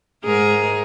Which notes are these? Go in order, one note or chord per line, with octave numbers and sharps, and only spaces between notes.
G#2 G#4 A#4